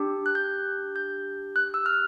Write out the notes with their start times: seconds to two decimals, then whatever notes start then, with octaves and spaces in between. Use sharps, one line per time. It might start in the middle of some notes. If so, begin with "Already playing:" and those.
Already playing: D4 G4
0.26 F#6
0.35 G6
0.96 G6
1.56 F#6
1.74 E6
1.86 F6